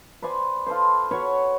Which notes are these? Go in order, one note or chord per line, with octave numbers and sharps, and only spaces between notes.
B4 C5 D5 G#5
F4 A4 B4 C5
F#4 B4 C#5 C#6